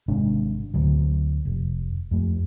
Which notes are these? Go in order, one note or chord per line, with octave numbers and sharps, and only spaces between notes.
G#1 C3 G#3 D4
D2 F#3
F1
F2 A3